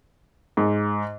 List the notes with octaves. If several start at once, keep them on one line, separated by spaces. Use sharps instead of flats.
G#2